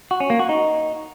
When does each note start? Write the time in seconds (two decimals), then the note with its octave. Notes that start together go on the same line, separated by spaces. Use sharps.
0.11 F#4
0.20 C#4
0.30 A#3
0.39 F#4
0.49 D#4